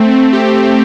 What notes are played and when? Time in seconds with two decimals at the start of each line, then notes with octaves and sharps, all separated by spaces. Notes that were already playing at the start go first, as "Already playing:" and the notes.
Already playing: A3 C4
0.11 A3
0.33 G4
0.54 A3